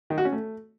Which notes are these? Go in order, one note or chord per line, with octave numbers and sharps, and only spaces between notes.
D#3
F#4
C#4
A3